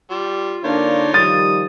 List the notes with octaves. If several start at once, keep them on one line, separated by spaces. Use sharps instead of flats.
G3 F4
D3 A#3 D4 D#4 F4 A#4 C#5
D#3 F3 G3 D#6 A6